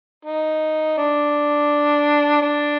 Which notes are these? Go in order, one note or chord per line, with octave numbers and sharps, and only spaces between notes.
D#4
D4
D4